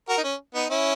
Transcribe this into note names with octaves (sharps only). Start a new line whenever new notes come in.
F#4 A#4
D#4
C#4
B3 D#4
C#4 E4